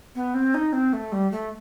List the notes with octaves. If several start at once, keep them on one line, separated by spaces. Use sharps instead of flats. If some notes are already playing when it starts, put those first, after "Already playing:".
B3
C4
D#4
C4
A3
G3
A3